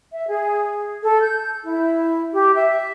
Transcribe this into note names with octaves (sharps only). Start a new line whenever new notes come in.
E5
G#4
A4
G6
E4
G4
E5